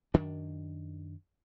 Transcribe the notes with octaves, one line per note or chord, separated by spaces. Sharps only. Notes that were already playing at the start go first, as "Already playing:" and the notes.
F#2 D#3 D4